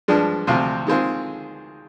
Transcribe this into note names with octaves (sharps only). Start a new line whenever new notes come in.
G2 F3 G#3 D4
D2 C3 F3 C4 F4
D#3 G#3 C4 F4 G#4